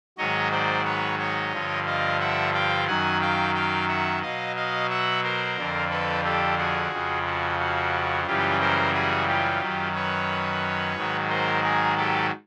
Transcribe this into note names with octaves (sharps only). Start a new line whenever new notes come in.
G#2 D#3 F#3 C#5 D#5
C5 D5
B4 C#5
C#5 D#5
G2 D3 F3
D#5 F5
E5 F#5
F5 G5
F#2 D#3 F#3 F#5 G#5
F5 G5
F5 G5
E5 F#5
B2 F#3 D#5 F5
D#5 F5
E5 F#5
A#4 C5
F2 D3 F3
A4 B4
G4 A4
F#4 G#4
F2 C#3 F3
F#4
F#4
F#2 C#3 E3 G3 F4 G4
A#4 C5
F#4 G#4
F4 G4
F#2 D#3 F#3
B4 C#5
G#2 D#3 F#3
A#4 C5
G#4 A#4
G4 A4